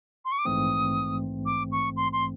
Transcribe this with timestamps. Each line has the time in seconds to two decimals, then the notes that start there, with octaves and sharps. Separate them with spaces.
0.25 C6
0.32 C#6
0.39 D6
0.45 A#1 G#2 E3 A3 C4 D#6
1.46 D6
1.72 C#6
1.96 C6
2.13 C6